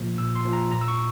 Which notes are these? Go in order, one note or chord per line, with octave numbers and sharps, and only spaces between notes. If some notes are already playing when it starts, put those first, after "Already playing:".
Already playing: A#2 F3 A#3
A#2 E6
C6
F3 A#3
A#5
A#2 A#5
E6
C#6